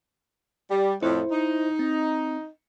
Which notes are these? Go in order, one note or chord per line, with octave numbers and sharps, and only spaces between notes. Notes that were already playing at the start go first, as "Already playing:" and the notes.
G3
F2 A2 E4 C5
D#4
C4